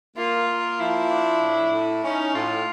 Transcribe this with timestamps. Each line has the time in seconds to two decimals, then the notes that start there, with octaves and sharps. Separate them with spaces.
0.17 A#3 F4
0.47 A#3
0.79 F3 E4
1.10 D4
1.41 A2
1.73 A2
2.04 C#4 D#4
2.34 A2 F4